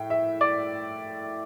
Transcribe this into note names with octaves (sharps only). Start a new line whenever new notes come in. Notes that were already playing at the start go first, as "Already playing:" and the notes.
Already playing: A2 A3 G5
E5
D5